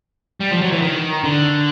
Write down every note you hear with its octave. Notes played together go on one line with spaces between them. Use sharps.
G3
F3
F#3
E3
D#3
D3